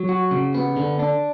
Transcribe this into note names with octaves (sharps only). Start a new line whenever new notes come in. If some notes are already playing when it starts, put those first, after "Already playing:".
Already playing: F#3
F#4
C#3
B3
D3
D4